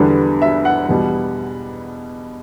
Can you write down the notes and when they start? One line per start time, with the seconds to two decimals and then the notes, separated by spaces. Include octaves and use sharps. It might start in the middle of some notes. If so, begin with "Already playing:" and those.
Already playing: E2 D3 G3 B3 D4
0.42 E5
0.65 F#5
0.89 E2 B2 G3